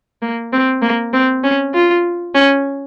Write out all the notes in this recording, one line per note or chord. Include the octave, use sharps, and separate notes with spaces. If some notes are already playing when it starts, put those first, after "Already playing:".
A#3
C4
A#3
C4
C#4
F4
C#4